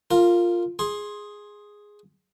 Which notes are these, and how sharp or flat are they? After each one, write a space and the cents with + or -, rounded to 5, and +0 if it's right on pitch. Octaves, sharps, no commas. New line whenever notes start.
F4 +0 A#4 -20
G#4 +0 C6 +15